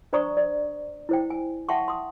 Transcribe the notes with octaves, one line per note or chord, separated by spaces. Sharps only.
D4 C5 D5 A#5 C#6 D#6
D5
E4 C5 G5
G#5
E5 F#5 G5 A5 C6 C#6
C6 D#6